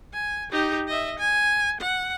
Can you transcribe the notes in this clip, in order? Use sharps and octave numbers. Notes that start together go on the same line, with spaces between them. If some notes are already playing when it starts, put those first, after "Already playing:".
G#5
D#4 G4
D#5 E5
G#5
F#5